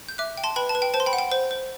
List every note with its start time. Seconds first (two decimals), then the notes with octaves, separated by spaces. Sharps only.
0.09 G6
0.18 E5 D6 F#6
0.38 G5
0.44 A5 C6
0.56 B4 G5 B5
0.69 A5
0.75 B4
0.82 G5
0.94 C5 A5
1.00 C6
1.06 G5 B5
1.13 F#5
1.19 G5
1.32 C5
1.51 C5